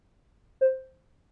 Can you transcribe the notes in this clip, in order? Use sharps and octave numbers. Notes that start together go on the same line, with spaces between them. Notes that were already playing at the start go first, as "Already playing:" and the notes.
C5